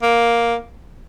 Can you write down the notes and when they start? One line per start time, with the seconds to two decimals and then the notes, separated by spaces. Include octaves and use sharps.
0.02 A#3